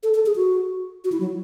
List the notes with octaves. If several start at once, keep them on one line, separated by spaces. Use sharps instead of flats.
A4
A4
G#4
F#4
F#4
E4
F#3